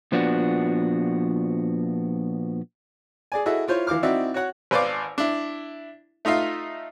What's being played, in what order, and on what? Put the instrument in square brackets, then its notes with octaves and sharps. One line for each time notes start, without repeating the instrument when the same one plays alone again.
[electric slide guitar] A#2 F3 B3 D4 F#4
[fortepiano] G#4 D5 G#5
E4 F#4 G#4 A4 D#5 E5
E4 F4 C5 C#5
E3 F5 D6 F6
C4 D#4 E4 F#4 D5 E5
F#4 C#5 F#5
G#1 B4 C5 D5 F5 D6
D4 E4
A3 D#4 F4 E5 F5